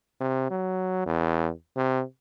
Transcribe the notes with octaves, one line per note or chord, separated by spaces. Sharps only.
C3
F#3
E2
C3